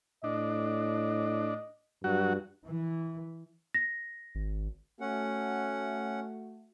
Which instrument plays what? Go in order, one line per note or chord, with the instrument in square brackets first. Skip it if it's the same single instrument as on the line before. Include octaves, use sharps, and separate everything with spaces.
[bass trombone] A2 [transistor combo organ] D4 [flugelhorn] D#5
[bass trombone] G2 [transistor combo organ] F#3 F#4
[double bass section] E3
[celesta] A#6
[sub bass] G#1
[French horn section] A3 F#4 [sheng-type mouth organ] C#4 F#5